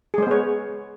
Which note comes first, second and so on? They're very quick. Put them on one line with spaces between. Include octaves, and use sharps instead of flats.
G#4 G#3 C5 B3 C#5